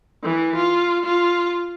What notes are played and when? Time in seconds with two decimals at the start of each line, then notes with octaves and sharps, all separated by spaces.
0.23 E3
0.56 F4
1.05 F4